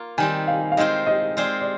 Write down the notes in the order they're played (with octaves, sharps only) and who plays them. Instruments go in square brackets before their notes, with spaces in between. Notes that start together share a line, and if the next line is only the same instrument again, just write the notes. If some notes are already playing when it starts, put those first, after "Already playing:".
Already playing: [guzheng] A#3 F4
[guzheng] D#3 G3 C4 [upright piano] G#5
[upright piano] F5
F5
[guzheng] D#3 G#3 C4 F4 C5 [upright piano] D#5
[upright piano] D#5
[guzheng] G#3 C4 F4 C5 [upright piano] D5
[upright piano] D5